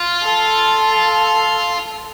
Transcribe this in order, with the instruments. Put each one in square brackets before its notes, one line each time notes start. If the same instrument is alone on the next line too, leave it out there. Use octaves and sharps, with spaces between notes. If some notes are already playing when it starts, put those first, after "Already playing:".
Already playing: [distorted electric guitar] F4
[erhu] A4